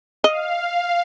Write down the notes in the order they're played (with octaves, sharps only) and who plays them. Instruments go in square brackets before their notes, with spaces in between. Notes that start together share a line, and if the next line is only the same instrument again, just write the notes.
[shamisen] D#5 [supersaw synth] F5